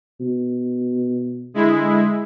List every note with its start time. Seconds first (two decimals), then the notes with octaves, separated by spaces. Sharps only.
0.20 B2
1.54 D3 G#3 E4